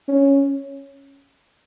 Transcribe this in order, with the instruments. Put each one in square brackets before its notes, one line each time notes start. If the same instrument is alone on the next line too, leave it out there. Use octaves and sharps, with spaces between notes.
[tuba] C#4